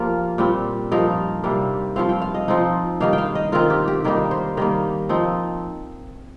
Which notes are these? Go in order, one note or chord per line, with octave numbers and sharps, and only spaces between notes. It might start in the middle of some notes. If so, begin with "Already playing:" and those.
Already playing: F3 A#3 F4 G4 A#4
A#2 G3 C4
G2 F3 D#4 A#4
C3 G3 A#3
G2 F3 C4 F5
G5
F5
D#5
F3 C4 D#4
G2 D#3 A#3 D#4 F5
G5
F5
D#5
D#3 C4 F4 A#4
G4
G4
D#3 G3 A#3 D#4 A#4
C5
D#3 G3 A#3 D#5
F3 C4 D#4